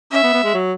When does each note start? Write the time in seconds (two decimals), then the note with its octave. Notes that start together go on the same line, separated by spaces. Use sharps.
0.12 C#4 E5
0.23 B3
0.33 B3
0.44 G#3
0.54 F#3